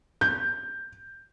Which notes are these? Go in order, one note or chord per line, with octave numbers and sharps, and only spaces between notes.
G6